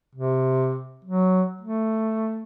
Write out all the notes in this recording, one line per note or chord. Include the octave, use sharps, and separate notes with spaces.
C3
F#3
A3